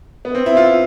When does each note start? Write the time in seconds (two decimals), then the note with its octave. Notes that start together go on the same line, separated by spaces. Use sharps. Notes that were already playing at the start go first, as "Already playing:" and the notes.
0.25 B3
0.35 C4
0.46 E4
0.57 F4